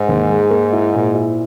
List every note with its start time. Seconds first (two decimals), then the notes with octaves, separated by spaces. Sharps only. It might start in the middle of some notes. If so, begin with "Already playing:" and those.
Already playing: G#2
0.09 D#2
0.30 G#3
0.51 A#3
0.73 E4
0.94 A#2
1.15 E4